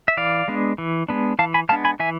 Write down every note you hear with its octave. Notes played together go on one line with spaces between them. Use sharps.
E5
E3 D5 F5
G#3 B3 D4
E3
G#3 B3 D4
E3 F5 A5
G#5 B5
G#3 B3 D4 F5 A5
G#5 B5
E3 E5 G#5